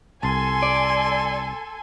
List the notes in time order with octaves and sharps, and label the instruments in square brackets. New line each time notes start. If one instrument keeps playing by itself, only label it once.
[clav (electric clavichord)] C2 A5 [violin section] A4 G#5 [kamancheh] C6
[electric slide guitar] D5